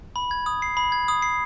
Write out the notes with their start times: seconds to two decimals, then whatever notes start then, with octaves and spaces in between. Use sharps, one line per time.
0.16 B5
0.31 G#6
0.46 D#6
0.62 C7
0.77 B5
0.92 G#6
1.08 D#6
1.22 C7